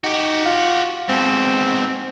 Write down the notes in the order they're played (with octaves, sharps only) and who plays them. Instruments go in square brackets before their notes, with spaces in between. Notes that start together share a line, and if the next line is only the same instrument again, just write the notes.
[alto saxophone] D#4 [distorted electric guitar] F#4 G4
[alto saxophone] F4
[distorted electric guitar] G#2 B2 [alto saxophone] C4